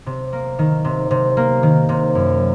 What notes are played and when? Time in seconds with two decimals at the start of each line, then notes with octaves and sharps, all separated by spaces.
0.06 C3
0.33 A#3
0.59 D#3
0.85 C3
1.11 C3
1.37 A#3
1.63 D#3
1.89 C3
2.15 F#2